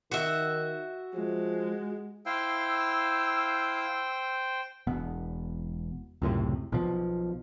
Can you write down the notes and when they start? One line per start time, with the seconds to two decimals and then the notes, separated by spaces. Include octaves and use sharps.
0.11 D#3 F#4 E5
1.14 F3 G#3
2.26 E4 C5 F5 G5 E6
4.87 E1 B3
6.22 C#2 F#2 A2 C3
6.72 B1 B2 F3